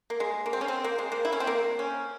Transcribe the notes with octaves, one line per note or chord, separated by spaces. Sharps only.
A#3
G#3
A#3
C4
C#4
C4
A#3
G#3
A#3
E4
C#4
C4
A#3
C#4